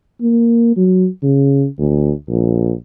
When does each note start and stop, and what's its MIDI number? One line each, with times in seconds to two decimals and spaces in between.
0.21 0.74 58
0.77 1.07 54
1.23 1.66 49
1.79 2.12 38
2.29 2.73 34